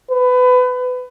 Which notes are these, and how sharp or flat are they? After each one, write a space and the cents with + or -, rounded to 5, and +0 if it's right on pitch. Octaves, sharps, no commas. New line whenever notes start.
B4 +25